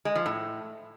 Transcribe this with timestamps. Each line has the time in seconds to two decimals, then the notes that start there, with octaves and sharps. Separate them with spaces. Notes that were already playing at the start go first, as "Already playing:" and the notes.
0.05 G#3
0.15 F3
0.26 A2